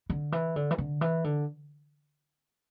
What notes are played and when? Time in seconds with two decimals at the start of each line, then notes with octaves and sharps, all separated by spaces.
0.10 D3
0.32 E3
0.56 D3
0.71 E3
0.78 D3
1.01 E3
1.24 D3